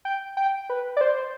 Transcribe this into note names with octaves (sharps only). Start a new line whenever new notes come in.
G5
G5
B4
D5
C5